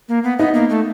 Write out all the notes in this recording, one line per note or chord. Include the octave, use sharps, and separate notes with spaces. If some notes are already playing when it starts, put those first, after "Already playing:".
A#3
B3
B3 D#4
A#3
A3